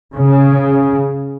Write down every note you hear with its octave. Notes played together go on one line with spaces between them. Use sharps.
C#3